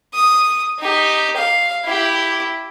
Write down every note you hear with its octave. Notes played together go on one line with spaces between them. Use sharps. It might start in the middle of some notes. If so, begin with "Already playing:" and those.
D#6
D#4 G4
F5
E4 G4